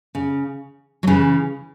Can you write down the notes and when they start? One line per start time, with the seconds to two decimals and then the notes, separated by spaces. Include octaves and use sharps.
0.15 C#3
1.03 F#3
1.07 C#3 E3